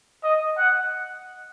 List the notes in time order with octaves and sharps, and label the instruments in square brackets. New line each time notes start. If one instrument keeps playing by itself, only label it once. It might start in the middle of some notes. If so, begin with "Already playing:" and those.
[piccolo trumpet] D#5
F#5